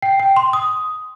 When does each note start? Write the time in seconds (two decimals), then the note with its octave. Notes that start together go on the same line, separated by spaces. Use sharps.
0.02 G5
0.20 G5
0.37 C6
0.53 D#6